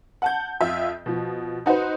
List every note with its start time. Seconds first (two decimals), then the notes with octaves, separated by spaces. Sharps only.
0.22 F#5 A5 G6
0.61 F2 F4 E5
1.06 B2 F3
1.66 D#4 F#4 B4 C5